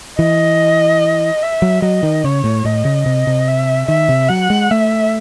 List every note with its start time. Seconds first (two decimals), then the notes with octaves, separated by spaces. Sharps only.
0.18 E3 D#5
1.42 E5
1.62 F#3
1.82 F#3 D#5
2.03 D#3
2.24 C#3 C#5
2.44 A2
2.65 A2 D#5
2.85 C#3
3.06 C3
3.27 C3
3.48 E5
3.88 D#3 E5
4.09 C3
4.29 F#3 F#5
4.50 G#3
4.71 A3 E5